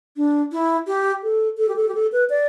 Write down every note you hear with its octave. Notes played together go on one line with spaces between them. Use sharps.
D4
E4
G4
A4
A4
G4
A4
G4
A4
B4
D5